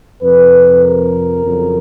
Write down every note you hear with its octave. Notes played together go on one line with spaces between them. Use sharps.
F2 C3 F3 B4
A#4
F2 C#3 F#3